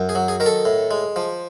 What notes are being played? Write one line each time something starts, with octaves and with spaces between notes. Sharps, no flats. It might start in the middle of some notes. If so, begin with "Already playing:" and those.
Already playing: F#2
G#4
F#3
G#4
D#3 A#4
A4
A2
G#3
F3